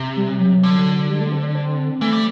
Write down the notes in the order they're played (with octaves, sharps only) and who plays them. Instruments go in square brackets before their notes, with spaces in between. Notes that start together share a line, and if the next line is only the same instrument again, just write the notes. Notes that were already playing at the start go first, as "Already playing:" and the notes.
Already playing: [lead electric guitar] C3
[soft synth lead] G3
F#3
[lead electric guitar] D3
[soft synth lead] G3
A3
C4
D4
C4
[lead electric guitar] E3 [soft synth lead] A3
[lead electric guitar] G3